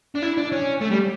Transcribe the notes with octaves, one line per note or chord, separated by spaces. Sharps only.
D4
E4
D4
C#4
A3
G3